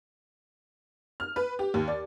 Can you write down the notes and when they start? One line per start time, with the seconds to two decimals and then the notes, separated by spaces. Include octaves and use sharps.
1.20 F6
1.36 B4
1.59 G4
1.74 D#2
1.88 D5